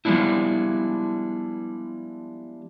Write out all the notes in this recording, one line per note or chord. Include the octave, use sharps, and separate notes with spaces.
F3 G3 G#3 B3 D4 E4